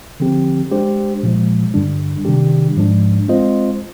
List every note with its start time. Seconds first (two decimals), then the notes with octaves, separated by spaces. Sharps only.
0.20 D3 F3 C4 G4
0.71 G#3 D4 G4 C5
1.23 A#2 F3 G#3
1.74 G2 D3 G3 D4
2.25 C3 D#3 G3 D4 G4
2.77 G#2 F3 G#3 D4
3.28 G#3 C4 F4 C5 D#5